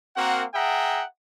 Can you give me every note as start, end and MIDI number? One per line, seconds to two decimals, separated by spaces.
0.16 0.45 58
0.16 0.45 60
0.16 0.45 66
0.16 0.45 70
0.16 0.45 78
0.55 1.04 68
0.55 1.04 76
0.55 1.04 78
0.55 1.04 79
0.55 1.04 82